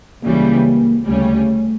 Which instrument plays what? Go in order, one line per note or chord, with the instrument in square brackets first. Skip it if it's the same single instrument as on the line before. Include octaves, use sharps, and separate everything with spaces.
[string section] C#2 C#3 E3 G3 [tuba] A#3
[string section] D2 C#3 G3 C#4 [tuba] A3